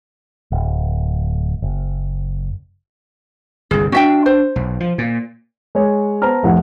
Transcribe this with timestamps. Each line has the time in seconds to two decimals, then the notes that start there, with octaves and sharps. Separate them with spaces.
0.52 D1
1.62 F#1
3.71 G1 C2 G#4
3.92 C4 D4 F#4 E5 G5
4.26 C5
4.56 B1
4.80 F3
4.98 A#2
5.75 G#3 C#5
6.22 B3 C5 A5 A#5 F6
6.43 F1 C2 F2 A2 F#5